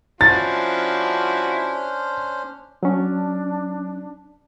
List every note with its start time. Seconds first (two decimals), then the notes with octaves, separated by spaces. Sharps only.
0.21 F3 C#4 D4 E4 F#4 C5 A6
2.83 F#3 C#4 D4